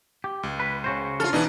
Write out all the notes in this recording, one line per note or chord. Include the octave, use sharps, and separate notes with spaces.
G4
C#2
B4
C#3 F#4 C5
F4 A4 F6
B2 E3 D4 D#4